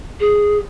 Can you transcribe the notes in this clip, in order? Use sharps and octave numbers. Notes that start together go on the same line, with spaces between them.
G#4